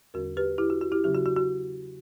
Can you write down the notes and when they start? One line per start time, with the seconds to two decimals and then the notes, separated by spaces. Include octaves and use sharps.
0.14 E2 D3 G3 C#4 F#4 A#4
0.37 G4 B4
0.58 E4 G4
0.70 F#4
0.81 F#4
0.92 E4 G4
1.03 C#3 F#3 C#4 G4
1.15 F#4
1.26 F#4
1.36 F#4